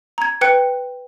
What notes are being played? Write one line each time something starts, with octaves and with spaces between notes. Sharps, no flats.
A#5 G#6
B4 G5 F#6 C#7